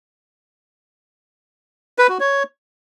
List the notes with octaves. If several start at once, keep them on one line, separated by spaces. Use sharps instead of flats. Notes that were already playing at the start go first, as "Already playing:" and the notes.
B4
F#4
C#5